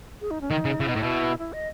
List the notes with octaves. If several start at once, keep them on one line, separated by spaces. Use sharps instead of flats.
G#4
D#4
C#4
D#3 D#4
C#3
C#3 E4
B2 D#4
A2
B2 E4
E4
D#5